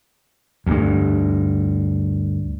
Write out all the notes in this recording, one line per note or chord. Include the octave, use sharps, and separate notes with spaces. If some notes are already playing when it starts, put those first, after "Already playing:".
D2 G2